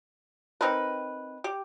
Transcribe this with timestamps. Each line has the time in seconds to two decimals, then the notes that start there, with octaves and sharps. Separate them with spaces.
0.61 C4 D#4 A#4 B4
1.44 G4